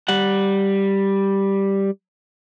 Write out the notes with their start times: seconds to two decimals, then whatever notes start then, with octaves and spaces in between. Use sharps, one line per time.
0.08 G3 F#5